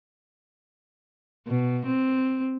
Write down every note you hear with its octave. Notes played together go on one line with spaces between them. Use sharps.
B2
C4